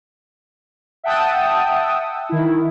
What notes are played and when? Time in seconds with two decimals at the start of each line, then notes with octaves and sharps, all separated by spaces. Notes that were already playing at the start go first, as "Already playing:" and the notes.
1.04 E5 F#5 G5 A5 D#6 E6
2.29 D#3 E4